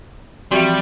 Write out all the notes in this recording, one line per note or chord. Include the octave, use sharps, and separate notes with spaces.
E3 F3 G3 C4 F#4 G4 G5